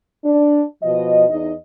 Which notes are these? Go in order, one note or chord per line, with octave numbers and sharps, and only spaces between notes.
D4
B2 F3 D#5
E2 D#4 D#5